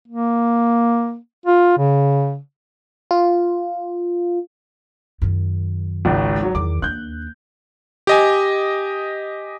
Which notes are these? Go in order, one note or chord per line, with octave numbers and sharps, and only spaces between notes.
A#3
F4
C#3
F4
F#2 D#3
G#1 C#2
F#3
E2 D#3 D6
D#2 D4 F#6 G6
G4 D#5 G#5